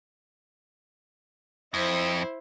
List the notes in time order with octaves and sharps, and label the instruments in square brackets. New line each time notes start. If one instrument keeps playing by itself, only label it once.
[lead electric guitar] F2 [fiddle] E4 C5